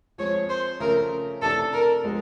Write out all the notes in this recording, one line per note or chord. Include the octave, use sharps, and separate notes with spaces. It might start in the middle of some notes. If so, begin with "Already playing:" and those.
F3 G#3 C4 C#5
C5
C#3 F3 A3 A#4
C3 E3 A3 D4 A4
A#4
F3 G#3 B3